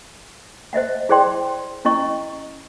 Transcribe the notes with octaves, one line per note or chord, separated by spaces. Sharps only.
C5 D#5 E5 F#5
E4 G#4 C5 D5 G5 C6
C#4 E4 D#5 C#6